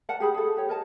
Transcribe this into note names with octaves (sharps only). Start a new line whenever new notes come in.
A#4 D5 F#5 A5
G4 G#4 B5
G#4 A4
G4 C#5
A#4 D#5 A5